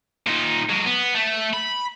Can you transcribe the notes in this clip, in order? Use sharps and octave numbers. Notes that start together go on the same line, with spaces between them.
A#2 D#4
F#3 G#3
B3
A3
B5